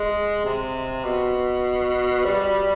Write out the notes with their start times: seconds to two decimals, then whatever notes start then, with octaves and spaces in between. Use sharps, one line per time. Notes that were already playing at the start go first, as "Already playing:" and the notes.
Already playing: G#3
0.45 C3
1.05 B2
2.25 G3